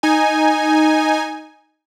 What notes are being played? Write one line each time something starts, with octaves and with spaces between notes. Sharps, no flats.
D#4 G#5